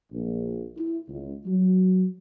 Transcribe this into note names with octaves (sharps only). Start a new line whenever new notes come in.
A#1
E4
C#2
F#3